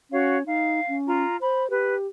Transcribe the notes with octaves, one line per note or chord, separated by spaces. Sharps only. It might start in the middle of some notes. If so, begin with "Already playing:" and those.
C#4 F#4 C#5 F5
D#4 F5
C#4
F4 A#5
C5 B5
G4 B4